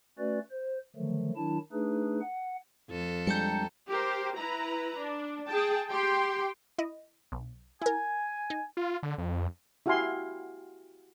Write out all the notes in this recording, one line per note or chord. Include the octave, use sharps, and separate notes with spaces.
A3 C#4 F#4 B4 D5
C5
D3 D#3 F3 F#3 A3
D#3 F#3 D4 E4 A5
A3 D4 D#4 G#4 B4
F#5
F2 A4
G3 G#3 D4 G5 A5 A#5 G6 C#7
G4 A#4 C5
E4 B4 A#5
D4
G#4 G5 A5
G4 G5 C6
E4 D#5
B1
E4 A#4 G#5
D#4
F4
D3
F2
E4 F#4 G4 F5 G#5 C6